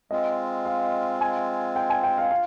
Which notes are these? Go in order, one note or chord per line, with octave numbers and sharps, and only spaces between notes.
G#3 C4 F4 D#5
F5
G#5
G5
G#5
G5
F5
F4 F5